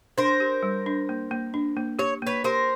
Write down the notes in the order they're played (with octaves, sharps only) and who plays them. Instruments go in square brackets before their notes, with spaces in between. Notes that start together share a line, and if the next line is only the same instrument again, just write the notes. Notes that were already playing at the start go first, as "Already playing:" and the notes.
[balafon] D4 [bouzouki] A#4 C5
[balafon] G4
G3
D4
A#3
A#3
D4
A#3
[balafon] G4 [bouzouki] C#5
[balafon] A#3 [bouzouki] B4 C#5
[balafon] G4 [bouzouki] A#4 C5